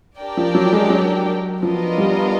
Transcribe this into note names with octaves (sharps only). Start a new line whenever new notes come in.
D4 G4 A#4 D5 G5
F3
F#3
G#3
F#3
F3 B3 D4 F4 A#4 D#5
G3